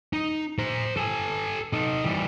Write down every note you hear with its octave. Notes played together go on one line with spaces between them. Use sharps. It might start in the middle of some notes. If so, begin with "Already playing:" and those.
D#4
C5 A#5
A4 G#5
D#4 A4
E3 G3